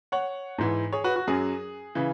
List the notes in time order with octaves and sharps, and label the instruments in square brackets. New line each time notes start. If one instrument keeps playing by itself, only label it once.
[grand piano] C#5 F#5
G#2 E3
G#4 C#5
F#4 B4
F#4
F#2 F#3 G#4
C#3 E3